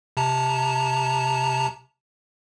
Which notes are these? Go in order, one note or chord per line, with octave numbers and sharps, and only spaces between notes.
C3 A5 A#5